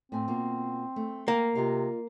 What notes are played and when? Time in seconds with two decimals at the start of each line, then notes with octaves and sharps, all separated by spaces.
0.12 A2 C4 G#5
0.28 B2 A#3 F4
0.96 A3
1.28 A#3 F#5 G5
1.55 C3 F4 D#5 F5